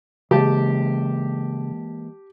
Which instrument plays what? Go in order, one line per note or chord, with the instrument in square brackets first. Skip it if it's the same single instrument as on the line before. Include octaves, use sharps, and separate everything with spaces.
[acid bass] C#3 [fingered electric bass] E3 G#3 A#3 [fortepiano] G4 A5